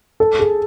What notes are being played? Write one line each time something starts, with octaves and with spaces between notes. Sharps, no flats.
A4
G#4